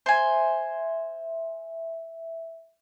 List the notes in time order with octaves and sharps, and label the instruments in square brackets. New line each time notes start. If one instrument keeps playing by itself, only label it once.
[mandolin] C5 G#5 [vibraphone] E5